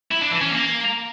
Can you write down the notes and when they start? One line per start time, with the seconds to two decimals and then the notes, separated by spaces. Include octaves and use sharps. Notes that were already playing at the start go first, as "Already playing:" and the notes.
0.11 E4
0.21 D4
0.31 E3
0.41 C#4
0.51 A#3